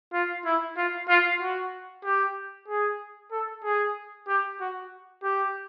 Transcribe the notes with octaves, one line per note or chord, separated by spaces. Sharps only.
F4
E4
F4
F4
F#4
G4
G#4
A4
G#4
G4
F#4
G4